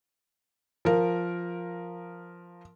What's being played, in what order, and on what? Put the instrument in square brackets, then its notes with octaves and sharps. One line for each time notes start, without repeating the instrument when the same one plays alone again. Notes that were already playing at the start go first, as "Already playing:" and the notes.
[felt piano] F3 A#4